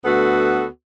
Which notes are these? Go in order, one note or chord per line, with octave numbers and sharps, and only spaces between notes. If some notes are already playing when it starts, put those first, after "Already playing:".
D2 B3 F#4 A4 B4